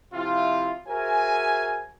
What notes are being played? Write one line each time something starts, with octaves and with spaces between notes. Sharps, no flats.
C3 F3 C4 E4 F4
F#4 G#4 A#4 C5 E5 G#5